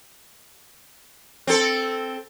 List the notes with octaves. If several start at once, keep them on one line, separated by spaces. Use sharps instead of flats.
C4 A4